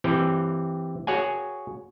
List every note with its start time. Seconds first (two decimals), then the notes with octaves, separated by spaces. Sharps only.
0.04 E3 C4 G4
1.07 F#4 G#4 C#5 F#5 G#5